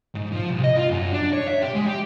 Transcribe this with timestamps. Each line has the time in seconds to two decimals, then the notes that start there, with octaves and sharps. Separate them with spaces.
0.14 G#2
0.32 F3
0.51 C2
0.64 D#5
0.77 F4
0.89 F#2
1.12 D4
1.33 C#5
1.47 E5
1.62 G4
1.74 G#3
1.86 G4